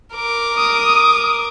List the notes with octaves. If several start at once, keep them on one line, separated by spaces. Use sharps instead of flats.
A#4 D6
D#6